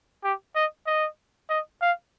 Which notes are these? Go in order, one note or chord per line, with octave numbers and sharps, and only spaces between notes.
G4
D#5
D#5
D#5
F5